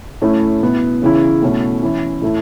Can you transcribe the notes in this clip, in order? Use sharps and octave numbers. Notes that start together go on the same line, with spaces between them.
A2 A3 C#4 E4
B2 B3 E4
C#3 E3 C#4 E4
B2 A3 C#4 E4
E3 C#4 E4
A2 A3 E4